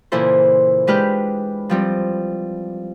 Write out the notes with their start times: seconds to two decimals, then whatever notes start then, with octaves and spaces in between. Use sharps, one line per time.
0.12 A#2 C#3 E3 E4 A4 C5
0.87 G#3 D4 G4 B4 F6 G6
1.69 F3 G3 C4